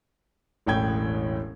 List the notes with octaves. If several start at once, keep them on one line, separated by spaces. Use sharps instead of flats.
E1 A1 A2 G5 G#6